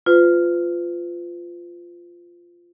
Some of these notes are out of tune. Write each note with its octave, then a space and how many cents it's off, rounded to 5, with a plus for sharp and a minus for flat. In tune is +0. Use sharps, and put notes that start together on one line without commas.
F4 -5 B4 +40